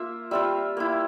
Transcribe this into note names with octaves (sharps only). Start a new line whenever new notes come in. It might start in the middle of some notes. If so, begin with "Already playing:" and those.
Already playing: A#3 F4 E5
G3 C4 F4 E5
A#3 E4